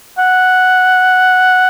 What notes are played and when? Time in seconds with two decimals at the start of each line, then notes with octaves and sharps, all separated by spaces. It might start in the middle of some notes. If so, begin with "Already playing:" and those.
0.18 F#5